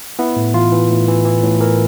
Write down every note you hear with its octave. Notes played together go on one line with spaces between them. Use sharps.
B3 E4
A2
E3 F4
E3
A2
E3
E3
A2
E3 A#4